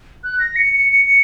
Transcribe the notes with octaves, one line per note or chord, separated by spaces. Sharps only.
F#6
A#6
C#7
C#7
C#7